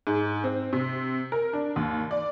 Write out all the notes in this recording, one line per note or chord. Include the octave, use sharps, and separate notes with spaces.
G#2
C4
C3
A#4
D4
D#2
D5